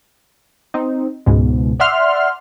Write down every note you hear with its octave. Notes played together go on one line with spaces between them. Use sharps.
C4 D#4
C#2 G#2 B2
D5 E5 F#5 C6 F6